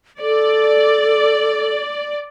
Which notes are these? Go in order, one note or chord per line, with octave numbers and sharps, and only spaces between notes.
A4 D5